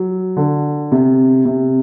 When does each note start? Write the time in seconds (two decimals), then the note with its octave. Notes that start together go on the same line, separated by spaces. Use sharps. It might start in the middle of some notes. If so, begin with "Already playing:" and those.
Already playing: F#3
0.37 D3
0.92 C3
1.45 C3